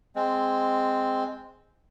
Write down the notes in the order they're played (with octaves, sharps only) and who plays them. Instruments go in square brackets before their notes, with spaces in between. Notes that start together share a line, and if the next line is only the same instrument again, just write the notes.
[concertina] G#3 C4